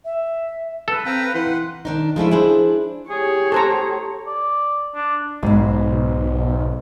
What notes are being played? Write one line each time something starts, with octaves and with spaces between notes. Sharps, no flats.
E5
A4 B4
C4 F5 G5 A#5
E3 F#5 C6
D#3 D4 D#4
F3 G#3 A3 E4
D4 E4 G#4 C5
G4 G#4 C#5
A4 C5 A#5
D5
D4
B1 G#2 B2